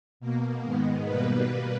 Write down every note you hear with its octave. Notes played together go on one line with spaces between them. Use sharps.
B2 A#3
G#2 D#3 G#3 B3
B2 G3 A#3 B4